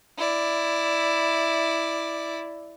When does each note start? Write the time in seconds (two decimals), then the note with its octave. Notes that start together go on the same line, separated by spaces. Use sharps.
0.18 E4 D5